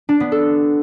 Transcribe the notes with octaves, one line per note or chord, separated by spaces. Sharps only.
D4
B3
A4